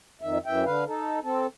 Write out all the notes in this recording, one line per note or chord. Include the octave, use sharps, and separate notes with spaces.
F2 D#3 E5
F#2 E3 E5 G5
D3 B4 F5
D#4 A4
C4 A4